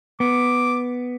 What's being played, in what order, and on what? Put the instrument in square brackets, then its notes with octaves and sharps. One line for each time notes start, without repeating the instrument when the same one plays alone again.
[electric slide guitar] B3 [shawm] D6